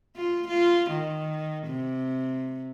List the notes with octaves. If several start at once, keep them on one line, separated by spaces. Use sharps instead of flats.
F4
F4
D#3
C3